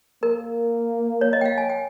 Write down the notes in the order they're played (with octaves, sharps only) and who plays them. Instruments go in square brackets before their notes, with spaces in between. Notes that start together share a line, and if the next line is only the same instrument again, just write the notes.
[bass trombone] A#3 [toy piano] A#4
[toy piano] C#5
D#5
G5
F5
G#5
G5